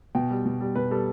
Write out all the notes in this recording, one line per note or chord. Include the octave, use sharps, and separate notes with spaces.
B2 G5
G3
B2
G3
B2 B4
G3 A4